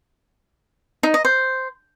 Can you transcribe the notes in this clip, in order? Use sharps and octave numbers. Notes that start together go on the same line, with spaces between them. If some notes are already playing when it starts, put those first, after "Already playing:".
D#4
D#5
C5